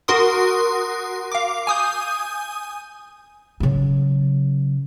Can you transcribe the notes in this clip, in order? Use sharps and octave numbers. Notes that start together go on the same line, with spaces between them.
F#4 A#4 C6 D#6
F5 D6
G#5 D#6 G6
C#3 F#3